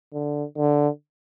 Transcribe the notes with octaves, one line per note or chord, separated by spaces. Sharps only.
D3
D3